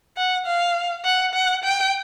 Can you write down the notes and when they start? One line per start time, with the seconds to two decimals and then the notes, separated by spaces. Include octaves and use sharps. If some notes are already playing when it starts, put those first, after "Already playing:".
0.17 F#5
0.46 F5
1.05 F#5
1.34 F#5
1.64 G5